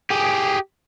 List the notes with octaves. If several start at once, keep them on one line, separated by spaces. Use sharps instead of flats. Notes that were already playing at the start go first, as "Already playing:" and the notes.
G4 G#4